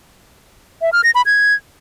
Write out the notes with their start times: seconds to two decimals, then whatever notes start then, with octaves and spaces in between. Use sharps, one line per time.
0.82 E5
0.93 F6
1.04 A#6
1.15 B5
1.26 G#6